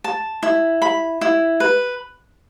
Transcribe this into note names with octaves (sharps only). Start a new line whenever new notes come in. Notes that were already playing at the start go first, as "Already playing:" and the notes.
A5
E4
B5
E4
B4